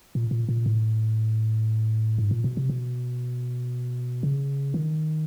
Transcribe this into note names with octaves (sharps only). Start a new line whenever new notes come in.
A#2
A#2
A#2
A2
G#2
A#2
B2
C3
B2
C#3
D#3